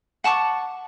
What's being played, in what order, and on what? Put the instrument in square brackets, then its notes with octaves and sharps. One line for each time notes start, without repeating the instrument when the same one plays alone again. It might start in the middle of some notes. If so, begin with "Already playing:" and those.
[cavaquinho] F#5 A5 C#6 D6